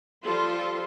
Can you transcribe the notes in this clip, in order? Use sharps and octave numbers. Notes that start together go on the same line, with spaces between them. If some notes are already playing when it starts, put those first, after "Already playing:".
F3 G3 F4 A4 C6